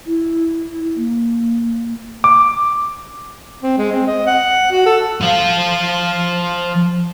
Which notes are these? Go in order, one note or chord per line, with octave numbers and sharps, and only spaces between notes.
E4
A#3
D6
C4
G#3
C4
D#5
F#5
F#4
A4
F3 F5